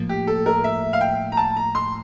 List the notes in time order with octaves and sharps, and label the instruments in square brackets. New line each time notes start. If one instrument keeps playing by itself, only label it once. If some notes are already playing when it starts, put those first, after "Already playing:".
Already playing: [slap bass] A2 F3 A#3
[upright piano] G4
A4
A#4
E5
F5
G5
A#5
A5
A#5
C6